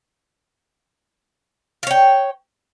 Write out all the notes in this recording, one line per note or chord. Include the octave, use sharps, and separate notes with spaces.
C#5 F5 G5